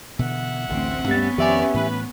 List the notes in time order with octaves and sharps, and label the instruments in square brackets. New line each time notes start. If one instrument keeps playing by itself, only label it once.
[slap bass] B2 D3 E3 [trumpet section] E5 F#5
[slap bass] A1 D3 [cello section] D2 C4
[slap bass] G2 G3 [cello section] B3 C#4 [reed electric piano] G4 A6
[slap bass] F2 D#3 F3 [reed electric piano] G4 E5 G#5 [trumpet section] C#5 D5
[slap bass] A2 E3 [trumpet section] B4